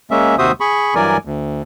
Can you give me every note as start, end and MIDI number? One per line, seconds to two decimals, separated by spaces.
0.11 0.36 56
0.11 0.36 58
0.11 0.36 61
0.11 0.36 76
0.39 0.52 39
0.39 0.52 48
0.39 0.52 66
0.39 0.52 72
0.39 0.52 76
0.39 0.52 87
0.60 0.94 68
0.60 0.94 83
0.60 0.94 85
0.95 1.17 43
0.95 1.17 52
0.95 1.17 54
0.95 1.17 70
0.95 1.17 74
0.95 1.17 80
1.25 1.62 38